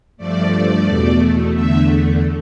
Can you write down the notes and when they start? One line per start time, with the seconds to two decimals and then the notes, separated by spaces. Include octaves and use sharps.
0.17 G2 F3 A3 D5
0.85 E2 B2 A3
1.53 E2 D3 A3 E5